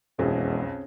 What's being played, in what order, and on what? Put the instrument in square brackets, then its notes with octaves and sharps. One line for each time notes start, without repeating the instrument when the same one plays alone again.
[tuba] E1 [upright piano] B1 F2 [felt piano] C4 C#4 G#4